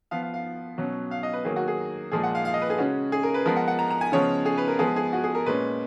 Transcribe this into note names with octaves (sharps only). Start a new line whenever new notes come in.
F3 B3 F5
F5
F5
B2 F#3 C#4
F5
D#5
B4
D#3 F#3 A#3 G#4
F#4
G#4
A#2 F3 G#3 G#4
F#5
F5
F5
D#5
B4
G#4
C#3 G#3 C#4 F#4
G#4
A#4
B4
F3 G#3 B3 A#4
F#5
F#5
A#5
A#5
G#5
C#3 F3 G#3 B3 C#5
G#4
B4
A#4
F3 G#3 B3 G#4
G#4
F#4
G#4
A#4
A#2 G#3 C#4 B4